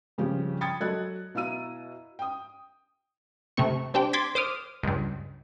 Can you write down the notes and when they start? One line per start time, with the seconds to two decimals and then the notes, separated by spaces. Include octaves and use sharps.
0.18 G2 C#3 F3 G4
0.61 G5 B5 D#6 G#6 A6 C#7
0.80 F#3 A4 D#5 F#6 G#6
1.35 B2 E4 F5 A#5 E6 D#7
2.19 G5 D#6
3.57 C3 A3 C4 C#6
3.94 C4 D4 G4 G5
4.13 C6 D6 G#6 A6 B6
4.35 C5 D6 D#6 F6
4.83 C#2 G2